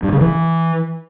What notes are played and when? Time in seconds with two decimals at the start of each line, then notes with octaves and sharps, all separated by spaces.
0.03 G2
0.12 C#3
0.21 E3